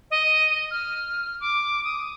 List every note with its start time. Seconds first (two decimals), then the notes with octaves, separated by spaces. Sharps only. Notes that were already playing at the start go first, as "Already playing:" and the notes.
0.10 D#5
0.71 F6
1.40 D6
1.84 D#6